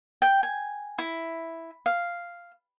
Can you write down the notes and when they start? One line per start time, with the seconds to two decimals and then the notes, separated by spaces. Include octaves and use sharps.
0.22 G5
0.43 G#5
0.98 E4
1.86 F5